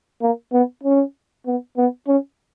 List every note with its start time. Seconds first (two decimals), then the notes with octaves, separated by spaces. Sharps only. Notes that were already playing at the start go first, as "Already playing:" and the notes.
0.22 A#3
0.53 B3
0.83 C#4
1.46 B3
1.77 B3
2.08 C#4